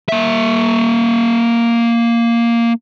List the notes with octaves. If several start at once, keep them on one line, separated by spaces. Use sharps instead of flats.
A#3 E5